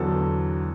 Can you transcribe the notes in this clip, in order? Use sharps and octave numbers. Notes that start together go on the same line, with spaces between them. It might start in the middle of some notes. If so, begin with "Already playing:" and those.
Already playing: E2 D3 F#3 A4